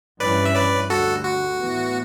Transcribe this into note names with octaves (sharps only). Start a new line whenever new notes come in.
G2 E3 G3 C#4 B4 D5
E5
B4 D5
D2 D3 G3 F#4 A4
F#4
A2 E3 B3